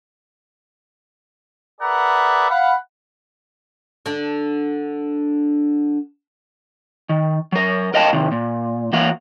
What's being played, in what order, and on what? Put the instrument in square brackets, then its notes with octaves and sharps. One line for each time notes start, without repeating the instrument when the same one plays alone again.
[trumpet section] G#4 A#4 B4 D5 E5 F#5
F5 F#5 B5
[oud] D3 D4
[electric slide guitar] D#3
F#3 A#4
A#4 D#5 F5 G5 A5
C3 D#3
A#2
E3 A#3 F#4 F5